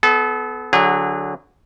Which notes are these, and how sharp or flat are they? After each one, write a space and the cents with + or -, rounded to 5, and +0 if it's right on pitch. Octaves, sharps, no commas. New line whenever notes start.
B3 +20 A4 -35
D3 +0 F#3 +0 G#4 -35